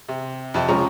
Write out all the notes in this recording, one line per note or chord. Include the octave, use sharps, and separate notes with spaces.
C3
F2 C3
C#2 F3 C#4 G#4 A#5